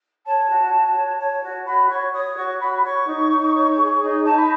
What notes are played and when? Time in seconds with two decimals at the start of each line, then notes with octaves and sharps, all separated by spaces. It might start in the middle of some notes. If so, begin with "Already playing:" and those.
0.25 C#5 A5
0.48 F#4
0.72 F#4
0.96 C#5
1.19 C#5
1.43 F#4
1.66 F#4 B5
1.89 C#5 C#6
2.12 C#5 D#6
2.36 F#4 C#6
2.60 F#4 B5
2.83 C#5 C#6
3.06 D#4
3.29 D#4
3.53 C#5
3.76 G#4
4.00 D#4
4.23 D#4 A5
4.35 B5